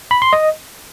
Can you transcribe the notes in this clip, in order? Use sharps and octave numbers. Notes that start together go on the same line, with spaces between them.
B5
C6
D#5